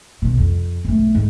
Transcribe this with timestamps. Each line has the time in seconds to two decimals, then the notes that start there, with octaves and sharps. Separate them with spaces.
0.22 B1 B2
0.37 F2
0.85 B1 A3
1.15 G#2